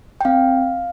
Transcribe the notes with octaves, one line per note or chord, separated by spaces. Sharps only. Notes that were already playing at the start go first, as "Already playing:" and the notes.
G5
C4 F5